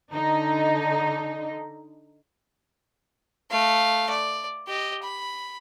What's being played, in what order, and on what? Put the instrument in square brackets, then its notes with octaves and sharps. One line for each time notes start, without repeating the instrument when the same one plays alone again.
[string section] D3 D#4
[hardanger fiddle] A3 F5
D5
G4 D#5
B5